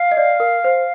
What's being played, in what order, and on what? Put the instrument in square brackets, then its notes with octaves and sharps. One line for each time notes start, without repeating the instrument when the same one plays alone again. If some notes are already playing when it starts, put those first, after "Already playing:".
Already playing: [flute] F5
[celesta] D#5
D5
A#4
C5